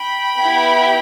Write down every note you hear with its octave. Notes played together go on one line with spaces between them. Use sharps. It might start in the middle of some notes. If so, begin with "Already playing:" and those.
Already playing: G5 B5
B3 E4 G4